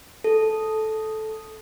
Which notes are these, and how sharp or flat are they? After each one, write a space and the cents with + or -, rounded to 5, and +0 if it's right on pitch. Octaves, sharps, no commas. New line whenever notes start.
A4 -10